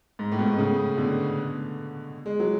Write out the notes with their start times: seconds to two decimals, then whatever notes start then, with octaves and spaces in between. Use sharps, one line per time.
0.19 G#2
0.32 A2
0.39 G#2 B2
0.58 A2 C#3
0.97 B2 D3
2.26 G#3
2.40 F#3